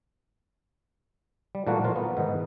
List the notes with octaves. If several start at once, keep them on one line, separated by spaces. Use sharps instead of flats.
G3
A#2 E3 G3 A3 A#3 F#4
F3 F4 A#4
B3
G#2 D#3 E3 B3